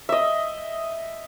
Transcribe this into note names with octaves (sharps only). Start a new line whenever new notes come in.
D#5 E5